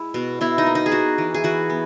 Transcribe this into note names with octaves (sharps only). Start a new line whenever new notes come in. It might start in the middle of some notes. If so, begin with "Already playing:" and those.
Already playing: G#3 E4
B2
B2 E4
D#4
A#3
D#4
G#4
A#3 F#4
E3
G#4
E3 F#4
B3